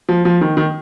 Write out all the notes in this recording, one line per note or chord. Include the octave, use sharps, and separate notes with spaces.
F3
F3
D#3
D#3